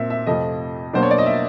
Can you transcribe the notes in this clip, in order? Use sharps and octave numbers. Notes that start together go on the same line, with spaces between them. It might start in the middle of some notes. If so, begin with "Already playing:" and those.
Already playing: A#2 C4 E5
E5
F2 C3 F3 A3 D#5
B2 F#3 A#3 D4 C5
C#5
D5
D#5
E5